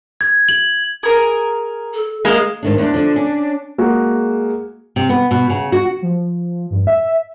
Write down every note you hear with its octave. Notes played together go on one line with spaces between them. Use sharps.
G#6
F#7
G#4 A#4
A4
G#3 A#3 G#4
G#2 D#3 D4
E2 D4
D3 F3
C#4
G#3 A#3 F#4 G#4
C3
B3
B2
C#3
F#4
F3
G2
E5